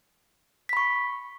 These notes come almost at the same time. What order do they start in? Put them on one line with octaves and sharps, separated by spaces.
B6 B5 C#6